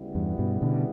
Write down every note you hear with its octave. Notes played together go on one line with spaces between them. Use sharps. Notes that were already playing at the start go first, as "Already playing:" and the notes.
Already playing: D2 C#3 G3 B3 E4
E2 G2
G2 B2
B2 D3